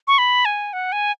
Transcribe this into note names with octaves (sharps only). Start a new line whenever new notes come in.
C#6
B5
G#5
F#5
G#5